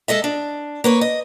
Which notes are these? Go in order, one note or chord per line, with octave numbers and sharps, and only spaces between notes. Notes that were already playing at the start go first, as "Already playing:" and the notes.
G#3 A4 D#5 E5
D4
A#3 B4 C#5
D#5